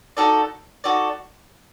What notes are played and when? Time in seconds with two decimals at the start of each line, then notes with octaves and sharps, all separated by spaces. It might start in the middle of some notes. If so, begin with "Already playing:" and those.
0.17 D#4 F#4 A4 D5
0.84 D#4 F#4 A4 D5